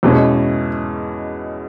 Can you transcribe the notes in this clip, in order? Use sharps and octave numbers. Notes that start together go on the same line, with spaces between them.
E2 B2 G#3 C#4